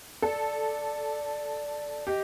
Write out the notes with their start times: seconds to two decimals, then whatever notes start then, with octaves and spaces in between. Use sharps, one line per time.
0.22 A4 D5
2.07 G4 D#5